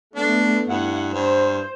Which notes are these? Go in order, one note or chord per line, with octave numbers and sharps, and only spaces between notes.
A3 B3 D4
G2 E4 F#5
G2 C5